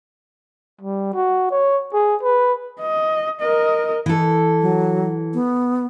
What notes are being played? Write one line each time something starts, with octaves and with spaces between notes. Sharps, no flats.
G3
F#4
C#5
G#4
B4
D#5
A#4 D#5
E3 A4
F#3
B3